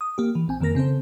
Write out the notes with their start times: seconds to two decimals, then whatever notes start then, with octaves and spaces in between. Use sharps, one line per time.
0.01 D#6
0.18 A#3 G4
0.35 E3
0.48 A#1 C4 G#5
0.60 F2 D#3 A#3 A#4 A#6
0.75 C#3 C4 A4 C5